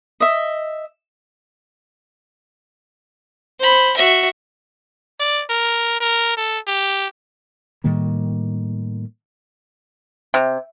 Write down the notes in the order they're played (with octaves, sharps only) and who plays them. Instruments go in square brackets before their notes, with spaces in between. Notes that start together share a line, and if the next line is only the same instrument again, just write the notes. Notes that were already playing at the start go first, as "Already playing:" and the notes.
[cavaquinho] D#5 E5
[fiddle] C5 B5
F#4 E5
[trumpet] D5
A#4
A#4
A4
G4
[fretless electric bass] A2 D#3 G3 A#3
[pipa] C3